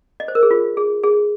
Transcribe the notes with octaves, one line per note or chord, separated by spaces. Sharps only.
D#5
C5
A#4
G#4
F4
G#4
G#4